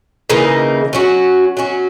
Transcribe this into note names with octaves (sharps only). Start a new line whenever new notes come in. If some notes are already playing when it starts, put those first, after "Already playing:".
C#3 E3 A#3 D#4
F#3 C#4 F#4
F#3 C#4 F#4